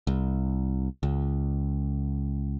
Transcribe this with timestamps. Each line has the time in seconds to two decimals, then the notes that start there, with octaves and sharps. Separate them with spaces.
0.07 C2
1.03 C#2